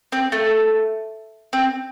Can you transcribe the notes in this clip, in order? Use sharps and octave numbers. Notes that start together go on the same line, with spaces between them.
C4
A3
C4